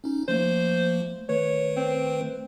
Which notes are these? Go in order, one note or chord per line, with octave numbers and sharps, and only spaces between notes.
C#4 D#4
F3 A3 A#3 C5
D#3 A3 B4 C#5
C4